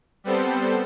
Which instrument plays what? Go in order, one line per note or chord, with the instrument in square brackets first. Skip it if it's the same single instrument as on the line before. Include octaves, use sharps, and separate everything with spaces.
[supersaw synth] G3 B3 C4 A4 C5